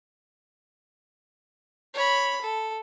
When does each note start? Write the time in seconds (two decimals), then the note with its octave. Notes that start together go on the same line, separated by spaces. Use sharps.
1.94 C#5 B5
2.41 A4